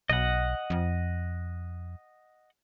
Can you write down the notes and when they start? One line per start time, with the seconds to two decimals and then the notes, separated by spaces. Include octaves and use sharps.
0.10 B1 D#5 F#5
0.70 F2